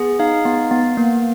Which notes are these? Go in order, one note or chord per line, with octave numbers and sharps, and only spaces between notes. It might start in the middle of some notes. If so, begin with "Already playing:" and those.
Already playing: B3 G#4
D#4 F5
B3
B3
A#3